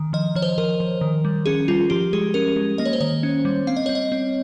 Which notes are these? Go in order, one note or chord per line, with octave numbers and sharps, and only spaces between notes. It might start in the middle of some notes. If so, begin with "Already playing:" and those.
Already playing: D#3
F3 D#5
F3 C#5
C5
F3 A#4
F3
D#3
G3
C#4 G#4
G3 F4
F3 G4
G#3 G#4
C#4 A#4
G#3
A#3 D#5
C#5
C5
D#3 C#5
C#4
G3
C4 F5
D#5
C4 C#5
D#5
C4